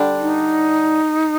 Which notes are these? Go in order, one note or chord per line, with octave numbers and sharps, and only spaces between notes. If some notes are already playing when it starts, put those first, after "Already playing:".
Already playing: D3 G3 D4
D#4